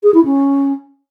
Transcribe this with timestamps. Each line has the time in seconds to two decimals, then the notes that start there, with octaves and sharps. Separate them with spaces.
0.03 G#4
0.14 E4
0.25 C#4